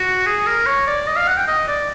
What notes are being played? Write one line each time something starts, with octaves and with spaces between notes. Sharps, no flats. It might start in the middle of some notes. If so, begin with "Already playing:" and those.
Already playing: F#4
G#4
A#4
C#5
D5
D#5
F5
F#5
G5
D#5
D5